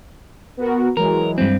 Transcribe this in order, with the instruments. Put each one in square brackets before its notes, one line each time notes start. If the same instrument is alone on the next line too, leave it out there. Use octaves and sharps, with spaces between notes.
[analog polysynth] B3 F#4 A#4
[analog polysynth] E3 F#3 G#3 [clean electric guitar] A#4
[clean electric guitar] G2 C4